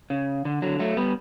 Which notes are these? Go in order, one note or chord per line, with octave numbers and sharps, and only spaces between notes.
C#3
D3
D3 F#3
F#3 A3
G3 B3